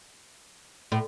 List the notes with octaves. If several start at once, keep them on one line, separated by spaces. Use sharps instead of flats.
A2